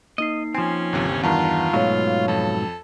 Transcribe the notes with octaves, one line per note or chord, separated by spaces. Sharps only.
A#3 D#4 D#5 C7
F3 C4 C#4 G#5
G1 D#2 C3
E2 G2 D#3 F4 F#5 A5 A#5
G#2 B2 F#3 A3 C#5 F5
F2 A4